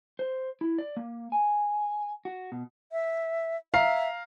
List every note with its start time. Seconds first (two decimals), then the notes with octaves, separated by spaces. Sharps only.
0.19 C5
0.61 E4
0.78 D5
0.97 A#3
1.32 G#5
2.25 F#4
2.52 B2
2.92 E5
3.74 E5 F5 A#5 C7